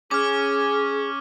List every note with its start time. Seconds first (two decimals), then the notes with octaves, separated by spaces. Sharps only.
0.11 C#4 G#4 D6 F6